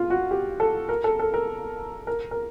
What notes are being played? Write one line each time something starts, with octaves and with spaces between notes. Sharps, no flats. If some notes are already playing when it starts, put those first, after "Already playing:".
Already playing: F4
F#4
G4
A4
A#4
A4
A4
A#4
A#4
A#4